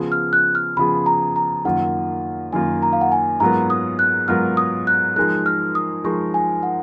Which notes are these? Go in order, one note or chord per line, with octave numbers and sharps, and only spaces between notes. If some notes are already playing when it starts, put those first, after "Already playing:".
Already playing: C#3 F3 B3 F4 G#4
F6
F#6
F6
C#3 F3 B3 F4 G#4 B5
A#5
A#5
F#2 D#3 A#3 F4 F#5
F#2 D#3 A#3 F4 G#5
A#5
F5
F#5
G#5
G#2 F#3 B3 F4 A#4 A#5
D#6
F#6
G#2 F#3 B3 F4 A#4 F6
D#6
F#6
F3 G#3 D#4 A#4 F#6
F6
D#6
F3 G#3 D#4 A#4 C#6
G#5
F#5